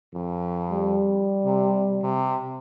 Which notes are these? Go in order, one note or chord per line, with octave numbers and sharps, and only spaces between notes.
F2
G3
C3
C3